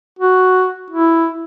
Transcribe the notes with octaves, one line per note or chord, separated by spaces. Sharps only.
F#4
E4